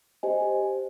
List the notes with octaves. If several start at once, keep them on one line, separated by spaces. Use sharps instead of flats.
G4 C5 D#5 G#5